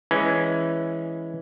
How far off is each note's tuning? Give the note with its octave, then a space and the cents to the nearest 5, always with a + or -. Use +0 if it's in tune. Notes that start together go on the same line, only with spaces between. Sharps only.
E3 +0 G#3 +0 C#4 +0